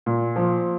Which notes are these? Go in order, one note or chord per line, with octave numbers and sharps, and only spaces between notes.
A#2
F3